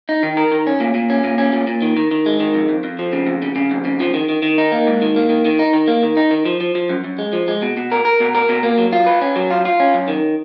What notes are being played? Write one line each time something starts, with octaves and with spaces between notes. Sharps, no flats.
D#4
D#3
A#4
D#3
C#4
A#2
A#2
C#4
A#2
C#4
A#2
A#2
D#3
D#3
D#3
G#3
D#3
F2
F2
F2
F3
C#3
F2
C#3
C#3
F2
C#3
F3
D#3
D#3
D#3
D#4
A#3
G#2
D#3
A#3
D#3
D#3
D#4
D#3
A#3
D#3
D#4
D#3
F3
F3
F3
F#2
F#2
G#3
F3
G#3
B2
B2
A#4
A#4
B2
A#4
B2
A#3
F#3
F4
B4
C#4
F#3
F4
F4
C#4
F#2
D#3